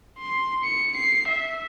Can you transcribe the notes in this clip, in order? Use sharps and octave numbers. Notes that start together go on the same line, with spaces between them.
C6
C#7
C7
E5